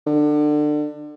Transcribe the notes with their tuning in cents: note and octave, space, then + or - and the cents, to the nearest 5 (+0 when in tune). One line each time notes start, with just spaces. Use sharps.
D3 +25